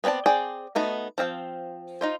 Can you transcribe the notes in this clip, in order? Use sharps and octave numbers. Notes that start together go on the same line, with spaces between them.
B3 C4 D4 D5 A5
C4 G#4 D5 G5
A3 B3 D#4 F#4
F3 C4 F5 G5
D#4 F4 C5